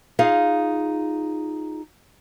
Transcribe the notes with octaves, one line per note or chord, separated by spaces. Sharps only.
D#4 F4 G#4 F5